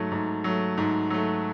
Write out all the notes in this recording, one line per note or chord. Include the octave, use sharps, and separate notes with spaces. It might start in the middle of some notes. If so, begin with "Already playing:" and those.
Already playing: G#2 F#3 A3
G#2
F#3 A3
G#2
F#3 A3